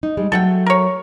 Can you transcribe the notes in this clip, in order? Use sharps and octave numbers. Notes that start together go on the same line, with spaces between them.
D#4
G3 G#3
F#3 A3 A4 F#5 G5
A#4 C#5